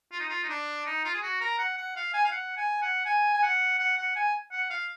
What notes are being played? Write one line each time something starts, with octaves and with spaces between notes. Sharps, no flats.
F4
D#4
F4
D#4
D4
D#4
F4
G#4
F#4
A#4
F#5
F#5
F5
G#5
F5
F#5
G#5
F#5
G#5
G#5
F#5
F#5
F#5
G#5
F#5
F5